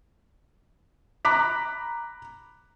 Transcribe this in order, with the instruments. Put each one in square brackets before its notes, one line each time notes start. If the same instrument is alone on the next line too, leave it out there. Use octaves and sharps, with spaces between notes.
[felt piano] A#5 B5 D6 F#6 B6